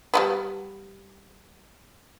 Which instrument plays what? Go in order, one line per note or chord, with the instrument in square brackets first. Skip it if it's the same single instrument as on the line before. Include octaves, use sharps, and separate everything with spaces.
[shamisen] G3 A3 B3